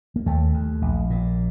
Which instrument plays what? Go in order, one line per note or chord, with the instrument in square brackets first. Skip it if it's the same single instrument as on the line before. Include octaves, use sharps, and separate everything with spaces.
[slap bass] A#3
D#2 A3
D#2
A#1
A#2